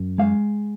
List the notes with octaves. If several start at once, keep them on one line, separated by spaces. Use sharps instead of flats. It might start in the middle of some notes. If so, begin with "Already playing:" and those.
Already playing: F#2
G#3 F5